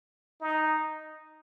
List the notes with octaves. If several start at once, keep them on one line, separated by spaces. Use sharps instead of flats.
D#4